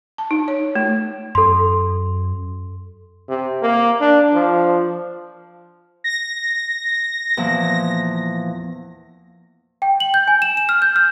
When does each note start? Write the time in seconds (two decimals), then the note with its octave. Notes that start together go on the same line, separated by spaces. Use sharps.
0.18 A5
0.31 D#4
0.48 C#5
0.75 A3
1.35 F#2 A4 C6
3.29 C3
3.62 A#3
4.01 D4
4.34 F3
6.04 A#6
7.37 E2 A#2 F3
9.82 G5
10.00 F#7
10.14 G6
10.28 G#5
10.42 E7
10.57 E7
10.69 F6
10.82 G6
10.96 F6